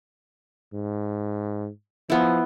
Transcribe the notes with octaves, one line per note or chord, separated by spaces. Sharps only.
G#2
F3 B3 E4